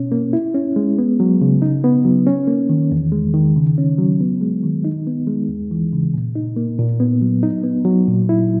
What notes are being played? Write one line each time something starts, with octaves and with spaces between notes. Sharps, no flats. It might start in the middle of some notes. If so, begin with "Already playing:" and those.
Already playing: B2 C#4
A#3
E4
C#4
G#3
B3
F#3
C#3
D#4
B3
F#3
C#4
A#3
D#3
E2
G#3
D#3
C#3
C#4
F#3
B3
G#3
D#3
D#4
B3
G#3
D#2
E3
C#3
A#2
D#4
A#3
A#2
B3
F#3
D#4
B3
F#3
A#2
E4